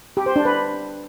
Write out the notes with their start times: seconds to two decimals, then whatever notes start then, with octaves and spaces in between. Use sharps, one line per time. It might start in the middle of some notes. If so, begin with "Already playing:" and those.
0.17 G4
0.26 C5
0.36 D4
0.45 B4